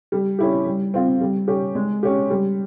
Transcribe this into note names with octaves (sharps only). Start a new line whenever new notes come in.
G3
C#4 E4 G4
G3
C4 F4
G3
C#4 G4
G#3
C#4 G4
G3